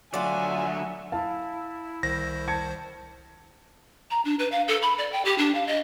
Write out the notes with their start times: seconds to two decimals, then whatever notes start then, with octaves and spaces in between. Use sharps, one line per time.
0.14 D3 F#3 F4 F#4 D5 E5 G#5
1.12 E4 F5 A5
2.03 C2 D#3 C5 A#6
2.48 A5 G#6 C#7
4.11 A#5
4.25 D4
4.39 B4
4.52 F5
4.68 A4
4.82 B5
4.98 D5
5.12 G5
5.25 G4
5.38 D4
5.55 F5
5.67 D#5